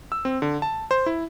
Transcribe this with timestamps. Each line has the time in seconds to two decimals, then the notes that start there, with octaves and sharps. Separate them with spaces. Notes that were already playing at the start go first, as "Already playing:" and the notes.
0.12 E6
0.25 C4
0.42 D3
0.62 A5
0.91 C5
1.06 E4